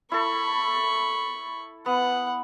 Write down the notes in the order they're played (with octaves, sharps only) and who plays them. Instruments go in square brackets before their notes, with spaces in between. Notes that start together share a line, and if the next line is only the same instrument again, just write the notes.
[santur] E4 A4 [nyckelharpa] B5 C#6
[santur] B3 [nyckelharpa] F#5